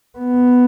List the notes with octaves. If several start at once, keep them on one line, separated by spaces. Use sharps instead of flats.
B3